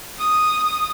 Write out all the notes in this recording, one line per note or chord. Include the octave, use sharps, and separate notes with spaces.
D#6